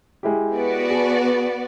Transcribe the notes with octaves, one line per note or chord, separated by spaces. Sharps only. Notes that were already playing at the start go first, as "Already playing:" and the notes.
G#3 E4 G4
B3 F#4 D5
G#4 A5